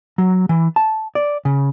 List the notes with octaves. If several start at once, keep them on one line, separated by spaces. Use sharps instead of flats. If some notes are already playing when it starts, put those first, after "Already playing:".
F#3
E3
A5
D5
C#3